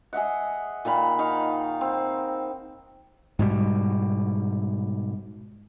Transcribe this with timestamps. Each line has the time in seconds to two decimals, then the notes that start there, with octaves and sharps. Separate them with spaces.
0.13 G#4 D#5 E5 F#5
0.85 A#2 D#3 A#3 B5
1.19 D#4 F5 F#5 C#6
1.81 C4
3.39 G#2 B2 G3